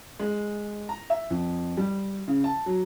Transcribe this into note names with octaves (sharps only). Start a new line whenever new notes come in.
G#3
A#5
E5
F2
G3
C#3
A5
F#3